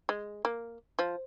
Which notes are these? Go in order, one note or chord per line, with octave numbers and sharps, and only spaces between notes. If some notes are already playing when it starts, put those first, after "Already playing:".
G#3
A#3
F3